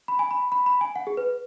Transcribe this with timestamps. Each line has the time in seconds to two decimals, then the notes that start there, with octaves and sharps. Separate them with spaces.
0.08 B5
0.19 G#5
0.31 B5
0.52 B5
0.66 B5
0.81 G#5
0.96 F#5
1.07 G#4
1.17 B4